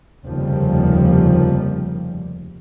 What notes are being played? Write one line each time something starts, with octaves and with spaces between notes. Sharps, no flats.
F1 D#2 C#3 F3 G3